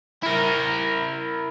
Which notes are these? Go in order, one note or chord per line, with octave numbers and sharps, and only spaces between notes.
E4 A#4